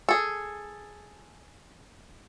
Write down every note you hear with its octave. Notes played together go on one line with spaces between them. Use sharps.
G#4 A4